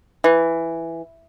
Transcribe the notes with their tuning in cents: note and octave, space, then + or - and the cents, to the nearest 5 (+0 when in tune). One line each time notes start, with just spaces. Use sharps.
E3 +5